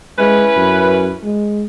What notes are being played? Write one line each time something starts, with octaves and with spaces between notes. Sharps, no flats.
G#3 C#4 E4 B4
F#2
G#3